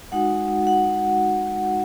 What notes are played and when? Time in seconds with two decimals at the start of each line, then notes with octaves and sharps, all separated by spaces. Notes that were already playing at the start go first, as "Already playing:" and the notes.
0.12 G#3 D#4 F#4 F#5
0.67 F#5